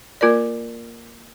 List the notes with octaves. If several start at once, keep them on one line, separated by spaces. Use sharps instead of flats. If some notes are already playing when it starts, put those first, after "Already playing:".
A#3 F4 A#4 D5